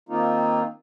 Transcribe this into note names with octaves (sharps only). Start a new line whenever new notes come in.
D#3 A#3 C4 D#4 F4